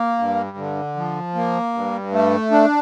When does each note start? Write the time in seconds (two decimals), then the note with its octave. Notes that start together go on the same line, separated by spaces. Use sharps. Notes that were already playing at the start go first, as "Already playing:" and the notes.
Already playing: A#3
0.19 G2
0.57 D3
0.96 F3
1.35 A#3
1.74 G2
2.13 A3
2.51 D4